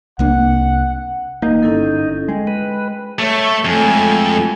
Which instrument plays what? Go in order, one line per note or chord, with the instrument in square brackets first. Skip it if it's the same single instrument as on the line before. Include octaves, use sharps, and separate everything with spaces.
[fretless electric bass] C2 A#3 D4 [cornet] F#5
[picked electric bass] G#1 A#3 [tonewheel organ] D#4
[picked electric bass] G1 [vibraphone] C#4 E4 A4
[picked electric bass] G#3 [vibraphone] G5
[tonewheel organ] B4
[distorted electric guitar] A3 [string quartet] C#5 C#6
[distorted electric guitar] F2 [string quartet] G#3 A3 G#5